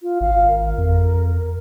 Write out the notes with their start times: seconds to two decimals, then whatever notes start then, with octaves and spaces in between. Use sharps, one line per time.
0.02 F4
0.21 G#1 F5
0.47 A#4
0.78 F2